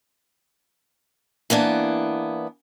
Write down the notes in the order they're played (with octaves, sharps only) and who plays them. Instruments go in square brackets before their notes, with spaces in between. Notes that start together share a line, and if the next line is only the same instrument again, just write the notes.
[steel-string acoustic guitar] E3 A#3 B3 D4